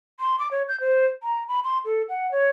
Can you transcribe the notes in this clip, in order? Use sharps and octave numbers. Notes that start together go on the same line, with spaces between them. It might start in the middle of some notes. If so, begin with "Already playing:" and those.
C6
D6
C#5
G6
C5
A#5
B5
C6
A4
F#5
C#5